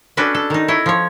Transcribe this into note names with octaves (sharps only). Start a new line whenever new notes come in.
C#4 D4 F#4 A4 B4
A4
D#3 D#4
E4 C#5 D#5
F3 C#5